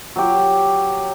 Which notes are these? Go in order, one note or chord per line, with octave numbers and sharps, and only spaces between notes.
F#3 G4